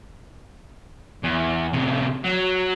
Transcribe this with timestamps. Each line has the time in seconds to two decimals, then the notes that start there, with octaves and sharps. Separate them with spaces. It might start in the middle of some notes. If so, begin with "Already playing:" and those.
1.23 E2
1.73 A2 C3
2.24 F#3